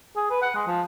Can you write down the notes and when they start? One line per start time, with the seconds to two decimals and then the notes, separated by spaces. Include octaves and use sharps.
0.16 G#4
0.30 B4
0.42 F#5
0.55 G#3
0.67 F3